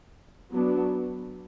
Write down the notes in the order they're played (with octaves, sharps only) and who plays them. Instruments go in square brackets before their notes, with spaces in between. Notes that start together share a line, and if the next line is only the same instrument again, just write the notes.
[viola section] F#3 B3 D4